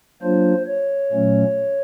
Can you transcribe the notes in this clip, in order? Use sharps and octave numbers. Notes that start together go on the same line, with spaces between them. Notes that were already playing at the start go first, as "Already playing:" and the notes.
F#3 A#3 D4 F4 C5
C#5
A#2 F#3 A3 C#4